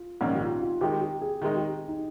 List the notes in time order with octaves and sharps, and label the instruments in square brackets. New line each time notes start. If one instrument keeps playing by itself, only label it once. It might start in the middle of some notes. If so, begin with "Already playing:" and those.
Already playing: [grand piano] F4
[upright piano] A#1 G#2 D#3 A#3 C#4 [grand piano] D#4
[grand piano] G4
F4
F4
[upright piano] D#3 G#3 D#4 [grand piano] G4
[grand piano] G4
G#4
[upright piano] D#3 G#3 D#4 [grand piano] G4
[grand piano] G4
D#4